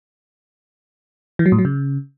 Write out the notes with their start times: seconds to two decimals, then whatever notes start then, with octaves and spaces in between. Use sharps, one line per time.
1.39 E3
1.46 F#3
1.52 A2
1.58 F#3
1.65 C#3